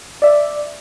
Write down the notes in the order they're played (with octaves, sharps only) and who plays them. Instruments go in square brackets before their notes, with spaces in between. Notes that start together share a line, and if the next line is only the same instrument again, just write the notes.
[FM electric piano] D5 E5